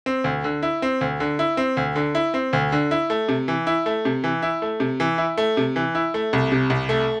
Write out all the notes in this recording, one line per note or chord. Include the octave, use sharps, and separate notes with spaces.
C4
D2
D3
E4
C4
D2
D3
E4
C4
D2
D3
E4
C4
D2
D3
E4
A3
C3
E3
E4
A3
C3
E3
E4
A3
C3
E3
E4
A3
C3
E3
E4
A3
C2
C3
C2
A3